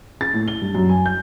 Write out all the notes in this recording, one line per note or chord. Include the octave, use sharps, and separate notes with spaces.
A6
A2
G7
G2
F#2
G#5
G6